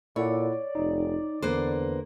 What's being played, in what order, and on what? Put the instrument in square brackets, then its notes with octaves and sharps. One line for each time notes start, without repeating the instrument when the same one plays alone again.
[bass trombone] A#2 [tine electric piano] E4 A4 F#5 [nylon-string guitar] C#5 [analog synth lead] D5
[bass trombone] F1 [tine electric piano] D#4
[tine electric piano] E2 [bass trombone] D3 [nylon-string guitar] A#3 B4 C5